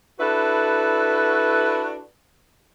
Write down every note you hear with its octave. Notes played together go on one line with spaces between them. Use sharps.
D4 E4 F#4 A4 B4